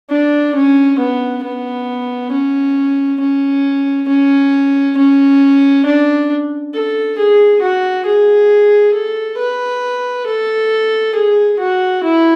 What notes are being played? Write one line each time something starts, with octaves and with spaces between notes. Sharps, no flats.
D4
C#4
B3
B3
C#4
C#4
C#4
C#4
D4
A4
G#4
F#4
G#4
A4
B4
A4
G#4
F#4
E4